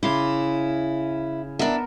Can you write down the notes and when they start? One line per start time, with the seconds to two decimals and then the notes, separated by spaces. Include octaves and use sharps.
0.03 C#3 E4 C6 D6
1.59 B3 D4 A#4 E5